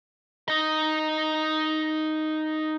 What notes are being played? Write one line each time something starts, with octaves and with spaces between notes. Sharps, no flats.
D#4 D#5